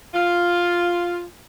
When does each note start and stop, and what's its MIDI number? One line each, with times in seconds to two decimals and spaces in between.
0.14 1.22 65